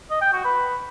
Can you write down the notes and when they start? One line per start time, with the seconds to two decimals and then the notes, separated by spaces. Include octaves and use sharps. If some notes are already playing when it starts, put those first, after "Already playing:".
0.11 D#5
0.22 G5
0.33 F#4
0.45 B4